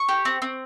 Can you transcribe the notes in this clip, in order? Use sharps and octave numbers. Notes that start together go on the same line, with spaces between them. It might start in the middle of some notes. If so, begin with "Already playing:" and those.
Already playing: C#6
G4
C4
C4